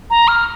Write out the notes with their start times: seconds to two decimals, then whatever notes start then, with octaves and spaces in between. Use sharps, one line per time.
0.10 A#5
0.28 F6